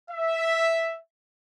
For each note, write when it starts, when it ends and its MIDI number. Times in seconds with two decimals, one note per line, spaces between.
0.11 0.99 76